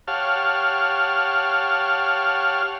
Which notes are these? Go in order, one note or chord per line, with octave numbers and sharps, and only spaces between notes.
G4 C#5 F5 F#5 A5 F6